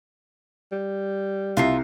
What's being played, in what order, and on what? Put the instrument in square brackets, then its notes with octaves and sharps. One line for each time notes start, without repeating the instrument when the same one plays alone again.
[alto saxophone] G3
[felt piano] C2 C7 [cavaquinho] F4 E5 A#5